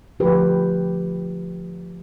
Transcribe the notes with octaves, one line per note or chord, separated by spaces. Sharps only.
D3 F3 A3 G4 B4